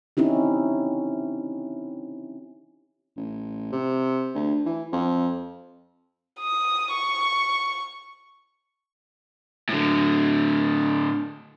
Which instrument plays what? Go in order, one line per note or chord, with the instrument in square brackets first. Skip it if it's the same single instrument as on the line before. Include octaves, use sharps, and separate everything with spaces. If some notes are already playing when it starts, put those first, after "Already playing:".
[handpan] C4 C#4 D#4 E4 G4
[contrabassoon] A1
C3
D2
E3
F2
[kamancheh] D#6
C#6
[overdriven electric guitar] A2 D3